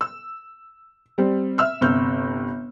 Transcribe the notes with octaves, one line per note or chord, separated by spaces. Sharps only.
E6
G3 C4
E5 E6 F6
G1 C3 F6 G6